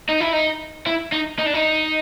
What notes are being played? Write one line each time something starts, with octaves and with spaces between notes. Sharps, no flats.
D#4
E4
D#4
E4
D#4
D#4
D4
D#4